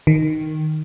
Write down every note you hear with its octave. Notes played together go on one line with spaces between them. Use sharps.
D#3